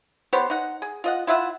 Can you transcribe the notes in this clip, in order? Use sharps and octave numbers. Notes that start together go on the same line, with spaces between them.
B3 G4 C5 C#5
D#4 F#5
G#4
F4 D#5 F#5
E4 F4 E5 F#5